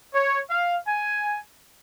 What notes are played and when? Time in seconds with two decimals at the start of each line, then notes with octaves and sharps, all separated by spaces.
0.14 C#5
0.50 F5
0.86 G#5